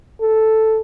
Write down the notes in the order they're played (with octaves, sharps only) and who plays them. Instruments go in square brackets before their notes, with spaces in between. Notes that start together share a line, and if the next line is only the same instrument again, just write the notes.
[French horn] A4